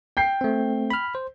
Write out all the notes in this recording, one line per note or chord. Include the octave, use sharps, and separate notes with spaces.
G5 G6 C7
A3 C4
B5 F6
C5